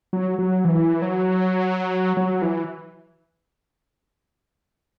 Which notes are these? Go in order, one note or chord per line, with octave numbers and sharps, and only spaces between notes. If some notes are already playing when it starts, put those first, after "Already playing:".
F#3
F#3
E3
F#3
F#3
E3